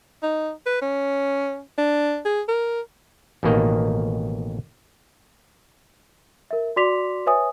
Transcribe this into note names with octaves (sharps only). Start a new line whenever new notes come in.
D#4
B4
C#4
D4
G#4
A#4
A1 B2 D#3 A#3 D#5
A#4 E5
F#4 D5 C6 D6 B6 F7
B4 C#5 E5 G#5 D#6